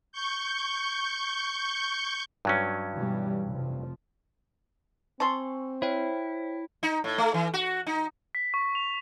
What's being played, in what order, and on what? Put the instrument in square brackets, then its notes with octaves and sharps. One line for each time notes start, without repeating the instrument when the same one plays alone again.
[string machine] C#6 G6
[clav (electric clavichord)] G2 F#3 C#4
[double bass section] B2 E3 G3
F1 F3
[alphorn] C4 [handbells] G#5 C#6 E6 [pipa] A5 C6
[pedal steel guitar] E4 [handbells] C5 C#5 G5
[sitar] D#4
A2
A3
E3
F#4
D#4
[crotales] B6
C#6
F7